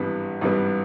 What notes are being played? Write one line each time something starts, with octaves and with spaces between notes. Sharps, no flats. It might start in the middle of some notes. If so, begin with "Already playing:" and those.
Already playing: G#1 G2 E3 G3 B3
G#1 G2 E3 G3 B3